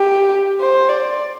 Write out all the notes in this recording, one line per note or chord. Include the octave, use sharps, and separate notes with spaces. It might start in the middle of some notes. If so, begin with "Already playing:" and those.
Already playing: G4
C5
D5